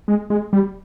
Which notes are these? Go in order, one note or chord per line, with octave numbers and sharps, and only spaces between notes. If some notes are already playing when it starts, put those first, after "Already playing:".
G#3
G#3
G3